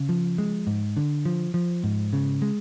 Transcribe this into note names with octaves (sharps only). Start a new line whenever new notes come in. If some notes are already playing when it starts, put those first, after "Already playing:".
Already playing: C#3
F3
G#3
G#2
D3
F3
F3
G#2
C#3
G#3